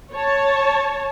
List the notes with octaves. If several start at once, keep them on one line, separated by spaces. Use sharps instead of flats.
C#5 A5